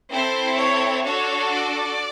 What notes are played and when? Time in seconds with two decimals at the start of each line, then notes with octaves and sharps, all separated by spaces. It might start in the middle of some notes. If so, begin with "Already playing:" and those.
0.11 C4 E4 A4 C5
0.57 C#5
1.04 D4 F#4 A4 C#5
1.51 D5